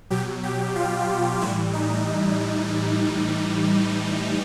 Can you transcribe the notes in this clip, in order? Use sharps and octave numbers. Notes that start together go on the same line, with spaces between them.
B2 F#3 G4
G4
F4
A2 E3 G3 E4
D#4